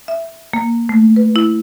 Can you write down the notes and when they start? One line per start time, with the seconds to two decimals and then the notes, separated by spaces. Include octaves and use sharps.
0.08 E5
0.53 A#3
0.89 A3
1.16 B4
1.36 E4